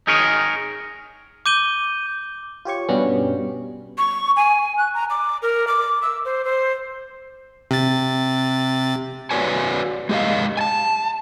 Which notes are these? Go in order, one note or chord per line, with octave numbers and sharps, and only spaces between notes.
D#4 G#4 A#4 C#5 D#5
D6 G6 D#7 G7
F4 G4 C#5 C#6
G2 B2 G3 B3 C#4
C#6
G#5
F#6
A#5
D6
A#4
D6
E6
C5
C5
C3 A6
F#4 B4 C#5 D5 G#5
G#3 G4 D#5 F5
G#5 A5